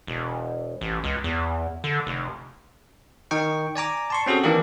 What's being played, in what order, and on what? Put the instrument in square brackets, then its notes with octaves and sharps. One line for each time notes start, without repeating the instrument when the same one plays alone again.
[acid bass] E1
A1
C#2
E2
D3
F1
[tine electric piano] D#3 D#4 G5 C#6
D5 G#5 A#5 D6
A5 C6 C#6
C4 C#4 F#4 G#4 A4
D#3 E3 A#3 D4 G4